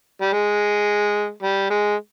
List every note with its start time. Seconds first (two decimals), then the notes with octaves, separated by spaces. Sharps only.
0.22 G3
0.32 G#3
1.43 G3
1.70 G#3